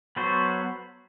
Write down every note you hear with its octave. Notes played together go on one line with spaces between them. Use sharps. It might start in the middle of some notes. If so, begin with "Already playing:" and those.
F#3 B3 F#4 A4 C5